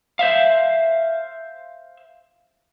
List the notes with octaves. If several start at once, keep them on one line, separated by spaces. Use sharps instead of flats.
C5 E5 F5